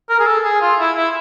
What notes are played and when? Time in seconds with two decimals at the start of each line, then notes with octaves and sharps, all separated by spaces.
0.10 A#4
0.20 G#4
0.27 A4
0.44 G#4
0.61 F4
0.79 E4
0.96 E4